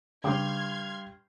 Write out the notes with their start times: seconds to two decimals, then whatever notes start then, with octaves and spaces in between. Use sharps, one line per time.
0.24 G2 C#3 G5 C6 D6 F6 G#6